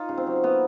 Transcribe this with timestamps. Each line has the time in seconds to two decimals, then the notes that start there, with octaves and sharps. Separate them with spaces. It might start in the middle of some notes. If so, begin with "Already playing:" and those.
Already playing: D#4 F4
0.09 C#3
0.18 C4
0.27 F#3
0.43 A#3 B3